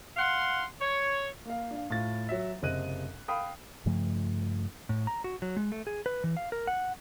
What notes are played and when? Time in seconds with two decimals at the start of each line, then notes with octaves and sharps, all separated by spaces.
0.16 F5 F#5 C6
0.81 C#5
1.45 A#3 F5
1.71 D4 F5
1.90 A2 F4 A6
2.29 F#3 E5
2.62 F#1 C3 C4 D#5 F#6 D#7
3.28 F5 G5 B5 D#6
3.86 G2 C#3 F3 A3
4.89 A2
5.07 A#5
5.24 F#4
5.42 F#3
5.57 G#3
5.72 A3
5.87 G#4
6.06 B4
6.24 E3
6.37 F5
6.52 A#4
6.67 F#5